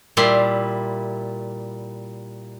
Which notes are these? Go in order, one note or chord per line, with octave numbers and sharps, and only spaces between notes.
A#2 G3 E4 C6